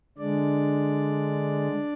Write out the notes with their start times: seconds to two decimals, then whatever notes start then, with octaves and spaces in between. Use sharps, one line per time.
0.18 D3 G#3 D4 D5